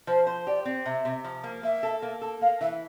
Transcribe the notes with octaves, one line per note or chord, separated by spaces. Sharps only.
F3 C5
C5
G4 D5
C4
C3 E5
C3
F3
A#3
A#3 E5
A4
A#3
A4
A#3 F5
E3 E5